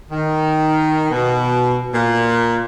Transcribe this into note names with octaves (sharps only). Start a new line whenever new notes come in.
D#3
B2
A#2